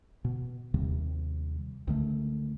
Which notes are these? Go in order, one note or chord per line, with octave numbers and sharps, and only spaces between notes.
B2
D#2 C3 D#3 G3
C#2 D3 D#3 A3